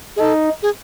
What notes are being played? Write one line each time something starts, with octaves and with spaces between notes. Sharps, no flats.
G#4
D#4 A4
G#4